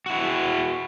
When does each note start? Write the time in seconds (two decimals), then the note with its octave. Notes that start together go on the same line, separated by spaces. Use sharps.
0.06 E4 F#4